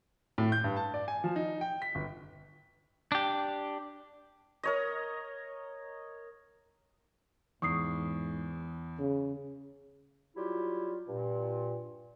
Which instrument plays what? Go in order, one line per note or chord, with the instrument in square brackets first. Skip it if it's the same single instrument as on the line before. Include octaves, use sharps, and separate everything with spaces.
[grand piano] A2
G6
G2
A5
D5
G#5
F3
D#4
G5
B6
G1
[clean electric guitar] D4 G4
[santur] A#4 C#5 D#5
[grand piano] E2 [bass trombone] G#2 [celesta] C#6 D#6 C7
[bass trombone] C#3
[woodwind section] F#3 G3 E4 F4 G4
G2 A#2